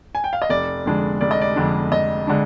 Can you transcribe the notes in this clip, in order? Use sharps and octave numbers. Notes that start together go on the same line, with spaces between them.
G#5
G5
F5
D#5
F1 D5
F2 D3 G#3 D4
F1 D5
D#5
D5
F2 D3 G#3 D4
F1 D#5
D3 G#3 D4